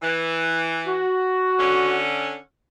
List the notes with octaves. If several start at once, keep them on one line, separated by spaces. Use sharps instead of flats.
E3
F#4
D3 C#4